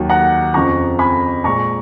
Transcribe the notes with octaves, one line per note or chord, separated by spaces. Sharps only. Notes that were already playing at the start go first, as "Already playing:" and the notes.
Already playing: D#2 D#3 F#3
F#5 A#5
F2 C#3 F3 A#5 C#6
G#5 B5
A#2 G#3 A#5 C#6